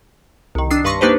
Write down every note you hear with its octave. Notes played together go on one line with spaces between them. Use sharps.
C2 D#3
D4 D#6 E6 C7
G2 B4 A5 C6 C#6 A#6
A#3 D4 D#4 G4 B4 C5